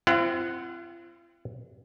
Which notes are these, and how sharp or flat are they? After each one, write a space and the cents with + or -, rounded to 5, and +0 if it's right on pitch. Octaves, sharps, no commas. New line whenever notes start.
C4 +0 F4 -45 F#5 +0